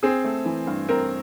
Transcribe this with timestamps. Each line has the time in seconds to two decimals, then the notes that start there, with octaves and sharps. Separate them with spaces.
0.03 C4 G#4
0.24 A3
0.45 E3
0.67 G2
0.88 C4 A#4